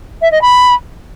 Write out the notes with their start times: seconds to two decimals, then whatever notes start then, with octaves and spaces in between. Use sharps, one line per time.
0.21 E5
0.31 D#5
0.41 B5